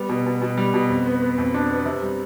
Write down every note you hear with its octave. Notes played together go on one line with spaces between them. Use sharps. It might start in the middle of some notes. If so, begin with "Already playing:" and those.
Already playing: G3 B3
B2
B2
B2
G3
B2
F2
B3
B3
F2
D4
B3
C3
G3